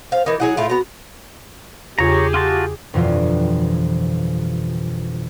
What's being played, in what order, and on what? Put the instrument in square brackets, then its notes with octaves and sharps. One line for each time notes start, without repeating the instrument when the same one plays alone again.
[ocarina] C5 [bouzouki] F5
[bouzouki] E3 D#4 [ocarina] A#4
[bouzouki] F#3 G#4 F#5 [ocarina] E4
[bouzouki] A2 A3 F4 [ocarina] E5
[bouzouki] B3 A#5 [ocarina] F#4
[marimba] E2 C#3 F4 [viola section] G4 G#4 [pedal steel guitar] C#5 A#5
[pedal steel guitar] F4 F#4 A5 [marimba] C6
[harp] G1 F2 B2 E3 F3 F4